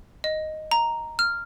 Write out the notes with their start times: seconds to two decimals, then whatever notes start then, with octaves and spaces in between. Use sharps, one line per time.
0.24 D#5
0.71 A#5
1.19 F6